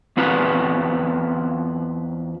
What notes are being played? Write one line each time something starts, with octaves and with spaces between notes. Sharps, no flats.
E2 C4 F4 B4